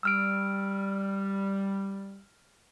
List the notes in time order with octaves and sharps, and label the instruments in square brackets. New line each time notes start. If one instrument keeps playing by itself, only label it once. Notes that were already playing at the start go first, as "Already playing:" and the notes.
[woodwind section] G3 [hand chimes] E6 F6 D7